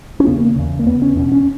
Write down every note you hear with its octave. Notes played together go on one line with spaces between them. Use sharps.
C#4
E2 C#3 B3
A#3
E2 C#3
A#3
E2 C#3 B3
C#4
E2 B2 C#4
C#4